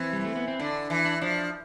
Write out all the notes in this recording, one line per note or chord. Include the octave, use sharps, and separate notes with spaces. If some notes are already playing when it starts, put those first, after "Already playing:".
Already playing: E3 C4
G3
A3
B3
C4
D3 D4
E3
D4
F3 D4